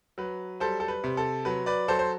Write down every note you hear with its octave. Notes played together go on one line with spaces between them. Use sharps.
F#3 B4
G3 A4 C5
A4
B4
C3
A4
F#3 B4
B4 D5
F#3 A4 C5
C5